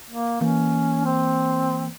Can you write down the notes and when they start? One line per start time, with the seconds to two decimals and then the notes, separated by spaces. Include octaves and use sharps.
0.10 A#3
0.41 E3 A#3 C#4
1.05 C4